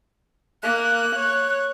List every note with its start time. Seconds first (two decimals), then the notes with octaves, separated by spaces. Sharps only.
0.63 A#3 F#6
1.16 C#5